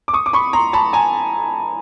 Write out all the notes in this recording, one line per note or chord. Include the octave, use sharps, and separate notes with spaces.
D6
C#6 D#6
D6
B5 C#6
A#5 C6
A5 B5
G#5 A#5